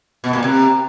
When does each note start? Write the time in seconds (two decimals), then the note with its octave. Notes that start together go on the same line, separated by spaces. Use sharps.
0.24 B2
0.33 A#2
0.43 C3